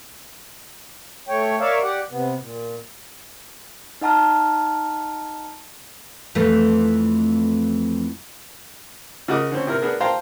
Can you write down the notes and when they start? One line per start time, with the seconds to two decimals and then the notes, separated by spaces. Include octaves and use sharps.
1.28 A3 C#5 G5
1.60 A#4 C#5 D5 E5 F5
1.83 G4 D5 F#5
2.10 C3 B3
2.40 A#2
4.01 D#4 D#5 F#5 A5 A#5 F6
6.35 F2 E3 A3
9.28 C#3 F#4 A#4 D#5 D6 D#6
9.51 D3 C4 C#4
9.67 C3 E4 A#4 F6
9.82 B3 D4 G#4 A#4
10.00 C5 F5 G5 A5 A#5 C6